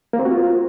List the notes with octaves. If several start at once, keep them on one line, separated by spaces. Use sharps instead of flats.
A#3
C4
F#4
F4